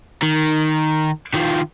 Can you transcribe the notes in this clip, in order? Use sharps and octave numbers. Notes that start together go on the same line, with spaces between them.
D#3
D#3 F3